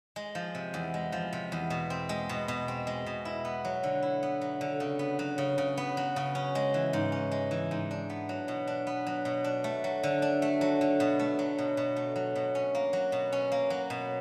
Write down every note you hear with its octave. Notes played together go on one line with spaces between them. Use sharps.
G#3
F3
C3
E2
G#3
F3
C3
E2
B2
C4
G#3
B2
B2
C4
G#3
B2
E4
B3
F#3
D3
E4
B3
F#3
D3
C#3
B3
F#3
C#3
C#3
B3
F#3
C#3
C#4
G#3
E3
G#2
C#4
G#3
E3
G#2
D4
B3
F#3
B2
D4
B3
F#3
B2
D4
A3
F#3
D3
D4
A3
F#3
D3
B2
A3
F#3
B2
B2
A3
F#3
B2
C#4
A#3
F#3
B2
C#4
A#3
F#3
B2